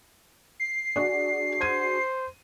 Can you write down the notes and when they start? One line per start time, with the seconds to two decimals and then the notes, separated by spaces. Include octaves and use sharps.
0.60 C7
0.96 D4 F#4 G#4 D5
1.61 C5 G#6 D#7